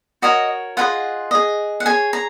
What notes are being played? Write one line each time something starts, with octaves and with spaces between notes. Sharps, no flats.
F#4 A#4 C#5 D#5
F4 G#4 B4 D#5 F#5
G#4 D#5
F#5
G#4 C#5 G#5
A#5